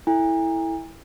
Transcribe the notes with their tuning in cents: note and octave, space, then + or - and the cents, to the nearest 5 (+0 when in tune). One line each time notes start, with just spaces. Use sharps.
E4 -10 A4 +0 G#5 -45